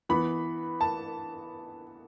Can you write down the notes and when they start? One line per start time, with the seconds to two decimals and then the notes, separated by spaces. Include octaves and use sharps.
0.09 E3 B3 B5
0.81 A5